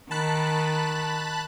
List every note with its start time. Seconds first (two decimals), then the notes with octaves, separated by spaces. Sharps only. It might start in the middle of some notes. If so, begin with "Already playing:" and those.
0.11 D#3 A5 B5 F#6